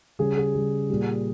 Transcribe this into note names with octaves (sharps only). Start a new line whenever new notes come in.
C#3 G3 G#4
G#4
C#3 G3
A#2 G3